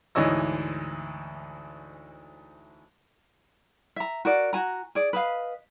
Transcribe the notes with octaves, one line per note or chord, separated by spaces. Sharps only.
D2 G#2 E3 C#5 D#5 E6
E5 A#5
F#4 A#4 D5
F#4 G#5 A#5
G#4 D5
B4 D#5 F5